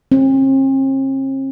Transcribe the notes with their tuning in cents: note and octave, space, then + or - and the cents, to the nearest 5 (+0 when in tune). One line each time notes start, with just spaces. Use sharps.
C4 +45